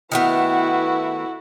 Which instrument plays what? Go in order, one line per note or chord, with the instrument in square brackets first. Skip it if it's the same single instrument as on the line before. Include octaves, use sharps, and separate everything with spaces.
[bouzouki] D#3 A3 B3 [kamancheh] E4 F#4